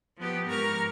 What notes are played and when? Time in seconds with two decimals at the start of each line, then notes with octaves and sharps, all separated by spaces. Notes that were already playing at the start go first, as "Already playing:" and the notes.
0.17 F3 B3 G4
0.48 G#2 A#4 A#5 C#6 F6